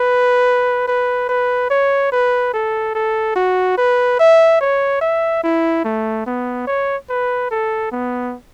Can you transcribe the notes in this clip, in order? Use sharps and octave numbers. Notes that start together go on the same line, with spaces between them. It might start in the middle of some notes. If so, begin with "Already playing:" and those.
Already playing: B4
B4
B4
C#5
B4
A4
A4
F#4
B4
E5
C#5
E5
E4
A3
B3
C#5
B4
A4
B3